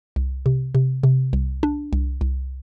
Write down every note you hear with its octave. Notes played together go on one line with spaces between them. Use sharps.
C2
C3
C3
C3
C2
D4
C2
C2